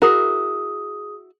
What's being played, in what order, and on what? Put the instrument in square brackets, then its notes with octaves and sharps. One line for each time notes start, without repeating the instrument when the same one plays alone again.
[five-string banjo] E4 F#4 A#4 [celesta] G#4 D#6